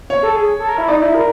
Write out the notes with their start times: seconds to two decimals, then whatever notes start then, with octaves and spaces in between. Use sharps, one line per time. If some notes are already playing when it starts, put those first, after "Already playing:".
0.10 C#5
0.23 A4
0.36 G#4
0.59 A4
0.69 A#4
0.78 E4
0.88 D#4 D5
1.02 E4
1.15 A#4